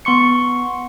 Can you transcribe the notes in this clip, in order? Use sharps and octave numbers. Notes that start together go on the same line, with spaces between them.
B3 C6 C#6 C#7